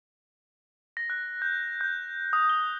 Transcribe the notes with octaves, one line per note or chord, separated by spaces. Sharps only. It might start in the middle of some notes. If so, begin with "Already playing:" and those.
A#6
F#6
G6
G6
D#6
G7